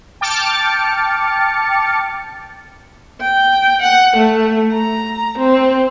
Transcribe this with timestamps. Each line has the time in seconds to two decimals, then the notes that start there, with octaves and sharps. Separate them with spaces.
0.21 G5 A5 D6 F6 A6 C#7
3.21 G5
3.82 F#5
4.16 A3
4.72 A#5
5.38 C4